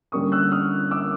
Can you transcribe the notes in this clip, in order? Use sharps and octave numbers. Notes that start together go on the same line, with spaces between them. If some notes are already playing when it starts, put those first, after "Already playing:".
D3 G3 A#3 C#4 C#6 D#6
E6 F#6
D#6 F6
D6 E6